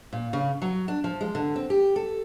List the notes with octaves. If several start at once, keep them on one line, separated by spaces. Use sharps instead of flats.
A#2
C#3
F#3
D4
F3
G#3
D3
C4
G4
A4